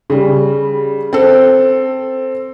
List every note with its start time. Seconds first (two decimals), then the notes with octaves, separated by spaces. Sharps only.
0.10 C#3 G3
1.13 C4 A4